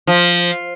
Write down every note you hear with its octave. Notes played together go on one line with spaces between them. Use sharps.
F3